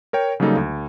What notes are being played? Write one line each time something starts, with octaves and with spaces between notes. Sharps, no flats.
A#4 C#5 G5
C#3 F#3 G3 A#3 D#4 A4
D2